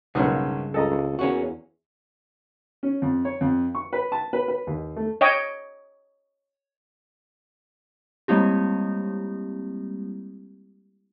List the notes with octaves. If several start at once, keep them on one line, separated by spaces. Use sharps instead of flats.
B1 G2 C#3 G#3 A#3 C#4
C#2 A4 D#5 A#5
E2 A#3 C#4 F#4
C#4
F2
C#5
F2
C#6
B4
A5
B4
B4
D#2
A3
C#5 D#5 G5
G3 G#3 A#3 C4 E4 G4